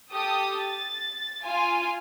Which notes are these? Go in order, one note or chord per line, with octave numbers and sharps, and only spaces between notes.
G4 A4 D#6
A6
F4 G#5